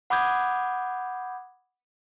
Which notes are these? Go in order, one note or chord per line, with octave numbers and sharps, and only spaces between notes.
F#5 B5 D6 D#6 G6 G#6